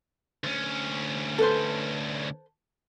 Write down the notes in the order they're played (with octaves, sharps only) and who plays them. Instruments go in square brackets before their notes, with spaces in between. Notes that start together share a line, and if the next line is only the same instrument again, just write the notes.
[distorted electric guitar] D2 C#4
[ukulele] A4 B4 C5